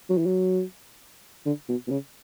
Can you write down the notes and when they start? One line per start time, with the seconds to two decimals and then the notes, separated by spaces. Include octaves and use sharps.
0.10 F#3
0.18 E3
0.26 F#3
1.45 D3
1.69 B2
1.87 B2
1.91 C#3